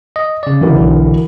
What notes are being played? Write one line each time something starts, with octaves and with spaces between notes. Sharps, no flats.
D#5
C#3 D5
E3 F#4 A#4
B1 D3